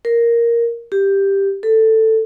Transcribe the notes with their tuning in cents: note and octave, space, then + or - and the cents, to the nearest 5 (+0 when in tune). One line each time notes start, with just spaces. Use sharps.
A#4 +5
G4 +5
A4 +10